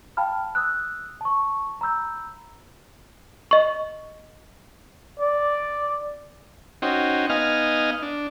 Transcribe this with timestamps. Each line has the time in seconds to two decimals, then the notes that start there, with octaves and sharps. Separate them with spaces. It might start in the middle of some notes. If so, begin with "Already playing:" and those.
0.17 F5 G5 A5 B5 F6
0.55 D#6 E6 F#6
1.21 A5 C#6
1.81 A#5 B5 E6 G6
3.51 D#5 C#6
5.20 D5
6.82 C#4 D#4 F#4 C5 G5
7.30 B3 D#4 D#5 F5 G#5 F6
8.02 D4